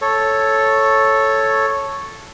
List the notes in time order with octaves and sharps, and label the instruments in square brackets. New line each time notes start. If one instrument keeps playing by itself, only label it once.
[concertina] A4 C#5